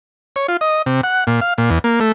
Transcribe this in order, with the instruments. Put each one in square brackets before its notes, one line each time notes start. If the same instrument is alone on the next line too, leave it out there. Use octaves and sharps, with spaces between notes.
[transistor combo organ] C#5
F4
D#5
C3
F#5
A#2
F5
A#2
E2
A#3
A3